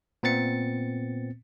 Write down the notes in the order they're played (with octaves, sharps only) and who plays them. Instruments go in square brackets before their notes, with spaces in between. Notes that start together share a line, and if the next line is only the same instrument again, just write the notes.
[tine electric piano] A#2 B3 C4 A6 C#7